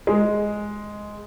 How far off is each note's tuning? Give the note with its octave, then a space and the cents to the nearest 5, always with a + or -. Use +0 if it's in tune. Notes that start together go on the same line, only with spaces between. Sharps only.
G#3 +5